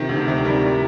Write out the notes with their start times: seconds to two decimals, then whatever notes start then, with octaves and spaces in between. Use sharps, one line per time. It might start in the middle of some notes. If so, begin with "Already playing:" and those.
Already playing: C3 D#3 F3
0.09 D2
0.28 C3
0.45 G3 A#4
0.63 A2